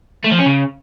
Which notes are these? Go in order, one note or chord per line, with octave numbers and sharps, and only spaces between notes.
A3
F3
C#4
C#3